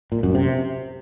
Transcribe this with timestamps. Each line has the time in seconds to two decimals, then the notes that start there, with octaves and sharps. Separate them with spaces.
0.12 A#2
0.23 F#2
0.35 C3